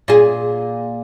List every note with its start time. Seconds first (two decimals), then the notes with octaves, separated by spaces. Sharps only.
0.08 A#2 G#4